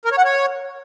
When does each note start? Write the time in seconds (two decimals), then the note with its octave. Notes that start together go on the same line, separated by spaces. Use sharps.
0.05 A#4
0.12 C#5
0.18 F#5
0.25 C#5